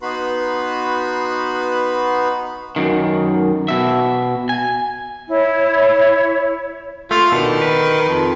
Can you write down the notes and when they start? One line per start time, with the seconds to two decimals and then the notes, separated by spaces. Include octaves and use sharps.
0.02 B3 D#4 F#4 B4 B5 C6
2.76 F#2 D#3
3.68 B2 E5
4.49 G#5
5.30 E4 C#5
7.11 A3 F4
7.32 B2 D3 D#3
7.62 B4
8.09 F2